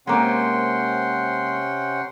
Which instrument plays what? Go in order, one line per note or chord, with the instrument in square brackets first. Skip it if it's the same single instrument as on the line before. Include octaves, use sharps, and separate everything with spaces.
[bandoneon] C3 C#4 G5 [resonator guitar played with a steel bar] G#3 A#3 C4 [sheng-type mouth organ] F#5 C6